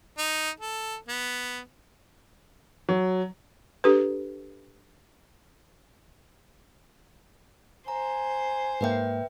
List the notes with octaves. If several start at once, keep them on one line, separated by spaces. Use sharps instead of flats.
D#4
A4
B3
F#3
D4 G4 A4 B4
C5 G#5 A#5
G#2 A#3 B4 E5 G5 G6